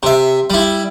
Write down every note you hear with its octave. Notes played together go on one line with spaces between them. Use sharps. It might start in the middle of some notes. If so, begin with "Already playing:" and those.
C3 E5
G3 E4